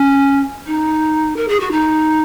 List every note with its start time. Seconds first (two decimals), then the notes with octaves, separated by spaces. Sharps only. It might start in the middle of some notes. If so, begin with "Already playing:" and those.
Already playing: C#4
0.66 D#4
1.36 A#4
1.48 G#4
1.60 F#4
1.71 D#4